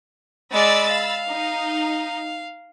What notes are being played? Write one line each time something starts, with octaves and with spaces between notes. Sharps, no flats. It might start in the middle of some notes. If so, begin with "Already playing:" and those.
G#3 D5 B5 E6 A6
F5
D#4